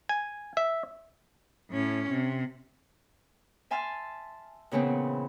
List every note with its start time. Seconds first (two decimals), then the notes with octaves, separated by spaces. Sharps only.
0.09 G#5
0.57 E5
1.71 A2 C#4
2.11 C3
3.71 E5 G#5 A5 C6 F6
4.71 A#2 C#3 E3 B3 C4